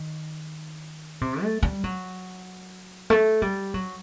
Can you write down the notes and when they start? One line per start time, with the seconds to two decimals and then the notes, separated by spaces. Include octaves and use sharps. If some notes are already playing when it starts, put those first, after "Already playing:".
Already playing: D#3
1.21 C3
1.43 A3
1.63 G3
1.84 F#3
3.10 A3
3.42 G3
3.74 F#3